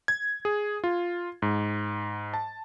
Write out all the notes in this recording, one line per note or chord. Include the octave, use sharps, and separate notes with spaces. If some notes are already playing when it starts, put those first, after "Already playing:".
G#6
G#4
F4
G#2
A5